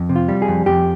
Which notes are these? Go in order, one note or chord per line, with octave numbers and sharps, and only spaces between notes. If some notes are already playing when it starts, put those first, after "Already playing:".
Already playing: F2
C3
F4
G3
G#4
F2
F2 G4